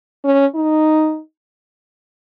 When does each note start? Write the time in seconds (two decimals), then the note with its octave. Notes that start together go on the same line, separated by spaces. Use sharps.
0.24 C#4
0.55 D#4